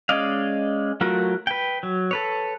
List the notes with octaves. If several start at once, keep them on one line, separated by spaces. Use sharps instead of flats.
G#3 C#4 D5 D#5 F5
F#3 A3 F4 F#4 A#4
B4 G5
F#3
A4 B4 C#5